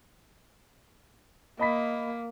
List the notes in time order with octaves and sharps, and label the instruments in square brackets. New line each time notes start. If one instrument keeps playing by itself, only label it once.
[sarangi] A#3 [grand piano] D#5 B5 B6